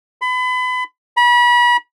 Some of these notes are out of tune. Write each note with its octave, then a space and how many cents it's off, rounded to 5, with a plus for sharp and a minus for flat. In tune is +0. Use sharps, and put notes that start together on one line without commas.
B5 +30
B5 -35